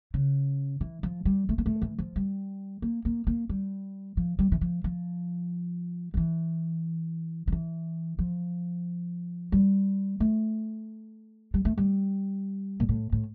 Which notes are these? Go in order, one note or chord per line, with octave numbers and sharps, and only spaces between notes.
C#3
E3
F3
G3
A3
A#3
A3
E3
F3
G3
A#3
A#3
A#3
G3
F3
G3
E3
F3
F3
F3
E3
F3
E3
F3
G3
A3
G3
A3
G3
A#2
A2
A2